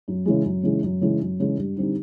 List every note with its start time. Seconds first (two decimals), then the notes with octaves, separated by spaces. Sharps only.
0.08 F#2
0.25 C#3 E3 G#3
0.45 F#2
0.63 C#3 E3 G#3
0.83 F#2
1.01 C#3 E3 G#3
1.21 F#2
1.40 C#3 E3 G#3
1.57 G2
1.76 D3 G3 C4 D#4